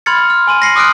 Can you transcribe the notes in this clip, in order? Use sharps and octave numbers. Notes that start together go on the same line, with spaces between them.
B5 C6 F6 G#6 A6 C#7
F6
G#5 C6 D#7
A#6 C7 C#7 F#7
D6 D#6 F6 F#6 D7